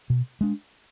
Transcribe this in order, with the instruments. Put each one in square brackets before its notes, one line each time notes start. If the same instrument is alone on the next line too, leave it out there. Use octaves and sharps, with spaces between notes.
[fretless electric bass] B2
G#3 D4